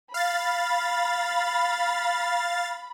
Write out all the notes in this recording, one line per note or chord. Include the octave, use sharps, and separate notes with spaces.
F5 B5 A6